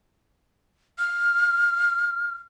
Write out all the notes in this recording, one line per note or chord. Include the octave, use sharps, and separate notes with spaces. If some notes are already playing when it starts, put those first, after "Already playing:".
F6